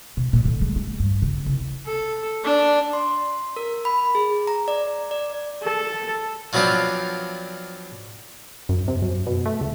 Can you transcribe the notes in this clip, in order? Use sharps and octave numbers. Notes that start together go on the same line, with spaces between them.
B2
A#2
D3
G#3
G#3
G2
C#3
C2
A4
D4
C6
A#4
B5
G#4
A#5
D5
D5
A4
F3 F#3 B3 C4 D4 F4
F#2
C3
F#2
B2
A3
C#2